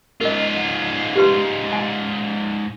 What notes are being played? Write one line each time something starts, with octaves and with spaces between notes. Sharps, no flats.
G#2 F4 A#4 D#5
G4 B4 C6
G#5